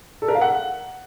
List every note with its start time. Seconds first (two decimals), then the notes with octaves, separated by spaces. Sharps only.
0.22 A4
0.28 A#4
0.35 F5
0.41 F#5